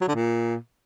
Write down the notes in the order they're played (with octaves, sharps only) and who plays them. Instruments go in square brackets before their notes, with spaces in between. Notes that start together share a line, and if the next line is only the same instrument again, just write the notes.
[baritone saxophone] F#3
D3
A#2